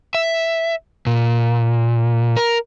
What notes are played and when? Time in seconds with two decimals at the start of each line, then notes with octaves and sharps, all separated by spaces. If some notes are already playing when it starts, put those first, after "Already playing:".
0.15 E5
1.06 A#2
2.37 A#4